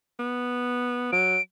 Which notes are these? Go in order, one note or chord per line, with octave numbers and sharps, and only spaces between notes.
B3
F#3 D7